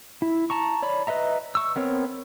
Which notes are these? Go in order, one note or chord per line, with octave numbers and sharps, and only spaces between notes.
E4
A5 A#5 C#6
C#5 D5 B5
B4 D#5 E5 A#5
C#6 E6
B3 C4 A#4 C#5